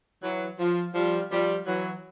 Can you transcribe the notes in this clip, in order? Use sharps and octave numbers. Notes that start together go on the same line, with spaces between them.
E3 F#3
F3
F3 G3
F3 G3
E3 F#3